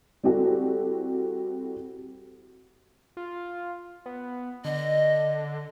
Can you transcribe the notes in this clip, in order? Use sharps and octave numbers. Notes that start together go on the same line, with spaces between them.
G3 C4 E4 F#4 G4 A4
F4
B3
D3 D#5